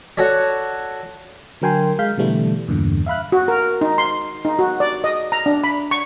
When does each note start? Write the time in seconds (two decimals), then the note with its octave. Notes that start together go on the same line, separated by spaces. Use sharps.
0.17 F#4 A4 C#5 D5
1.62 D3 F#3 A#4 G5 G#5 C6
1.99 G#3 F5 G6 B6
2.18 B2 D3 E3 G3 A3
2.68 E2 G2 A#2 D3
3.06 E5 F5 B5 F#6
3.32 F#4
3.48 A#4
3.81 D#4
3.98 C6
4.45 D#4
4.59 F#4
4.80 D5
5.04 D#5
5.32 A#5
5.46 D4
5.64 B5
5.91 C#6